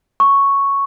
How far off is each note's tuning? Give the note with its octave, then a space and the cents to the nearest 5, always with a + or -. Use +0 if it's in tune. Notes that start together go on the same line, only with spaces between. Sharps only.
C#6 +0